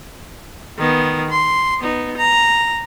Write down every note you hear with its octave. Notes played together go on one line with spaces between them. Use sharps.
D#3 B3
C6
B3 D#4
A#5